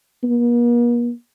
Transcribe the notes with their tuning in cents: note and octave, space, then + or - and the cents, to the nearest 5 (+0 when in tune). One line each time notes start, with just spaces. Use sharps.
A#3 +45